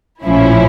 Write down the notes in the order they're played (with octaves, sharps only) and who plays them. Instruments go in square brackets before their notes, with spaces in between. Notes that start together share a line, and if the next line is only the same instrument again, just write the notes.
[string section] A#1 A2 F3 C#4 E4